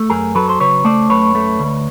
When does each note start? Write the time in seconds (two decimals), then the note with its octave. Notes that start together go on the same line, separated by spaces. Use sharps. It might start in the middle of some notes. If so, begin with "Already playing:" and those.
Already playing: A3
0.10 F#2 G#4 A#4
0.35 F#3 A4 B4
0.49 C5
0.60 C#3 B4 C#5
0.85 A3 C5 D5
1.10 F#2 B4 C#5
1.35 A3
1.60 D2